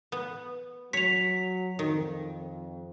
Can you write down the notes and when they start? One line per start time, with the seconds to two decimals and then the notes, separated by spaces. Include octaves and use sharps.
0.12 B3
0.93 F#3 C#5 B6 F7
1.79 F2 D#3